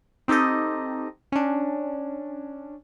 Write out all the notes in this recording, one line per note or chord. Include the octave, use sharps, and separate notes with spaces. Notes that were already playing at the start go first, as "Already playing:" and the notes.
C4 D#4 G4 A4 D#5
C#4 D4